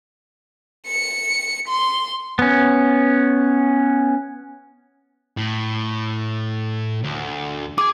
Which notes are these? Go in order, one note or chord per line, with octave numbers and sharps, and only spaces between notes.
C#7
C6
B3 C#4
A2
D2
G#4 G#5 D6